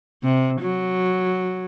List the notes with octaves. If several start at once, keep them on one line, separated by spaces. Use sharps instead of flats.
C3
F#3